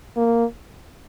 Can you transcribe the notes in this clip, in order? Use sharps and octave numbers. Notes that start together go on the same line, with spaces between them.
A#3